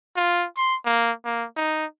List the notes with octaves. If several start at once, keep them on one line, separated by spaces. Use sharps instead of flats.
F4
C6
A#3
A#3
D#4